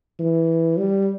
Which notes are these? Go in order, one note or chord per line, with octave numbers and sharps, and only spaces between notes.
E3
G3